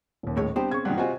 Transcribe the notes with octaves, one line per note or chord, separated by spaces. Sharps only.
D#1 D#2
A2 G#3 A3 C#5
G3 B3 C4 D4 G4 C5 G5
C#3 C#6 G#6
G2 A#2 D#3 F#5
C3 F4 F#4 C5 D#5 G#5